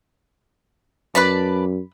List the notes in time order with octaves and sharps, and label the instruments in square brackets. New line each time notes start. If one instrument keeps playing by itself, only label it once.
[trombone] F#2 [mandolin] B4 D5 A5 [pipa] B5